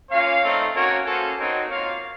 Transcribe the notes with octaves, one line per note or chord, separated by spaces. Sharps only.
A#3 C#4 F4 C#5 F5
A3 C4 D#4
A#3 C#4 F#4 A#4 C#5
A#3 C#4 F#4 A4 C5
C4 D#4 F#4 A#4 C#5
A#3 F4 C#5 F5